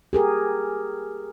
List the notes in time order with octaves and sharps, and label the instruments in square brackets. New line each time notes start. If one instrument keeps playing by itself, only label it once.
[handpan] G4 G#4 A#4